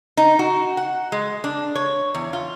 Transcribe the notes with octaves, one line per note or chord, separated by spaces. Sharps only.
D#4
F#4
F#5
G#3
D4
C#5
E2
F4